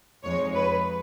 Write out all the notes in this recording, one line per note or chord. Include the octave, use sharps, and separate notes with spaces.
F2 F3 G#3 D#4 C#5
B4